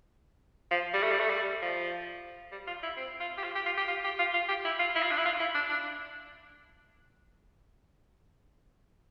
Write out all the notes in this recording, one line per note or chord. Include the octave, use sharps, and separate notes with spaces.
F3
G3
A3
G3
A3
G3
F3
G3
F4
E4
C4
F4
G4
F4
G4
F4
G4
F4
G4
F4
F4
G4
E4
F4
E4
F4
D4
E4
F4
E4
D4
D4